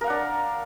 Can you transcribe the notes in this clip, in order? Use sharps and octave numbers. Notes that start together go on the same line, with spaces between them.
D4 A#4 F5 F#5